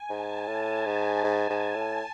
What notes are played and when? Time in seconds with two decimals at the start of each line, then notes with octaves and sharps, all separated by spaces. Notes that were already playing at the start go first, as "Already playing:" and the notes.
Already playing: G#5
0.09 G#2 A5
0.47 A2
0.86 G#2
1.24 G#2
1.50 G#2
1.75 A2